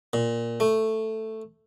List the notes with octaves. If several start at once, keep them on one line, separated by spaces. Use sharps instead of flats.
A#2
A3